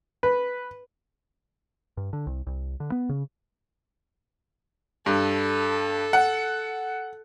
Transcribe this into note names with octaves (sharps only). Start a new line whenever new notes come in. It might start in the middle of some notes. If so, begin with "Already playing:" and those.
B4
G2
D3
C2
C2
D3
B3
C#3
G2 A4
F#5